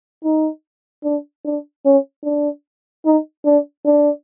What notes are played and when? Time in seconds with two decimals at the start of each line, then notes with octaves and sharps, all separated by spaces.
0.24 D#4
1.04 D4
1.45 D4
1.85 C#4
2.25 D4
3.06 D#4
3.46 D4
3.86 D4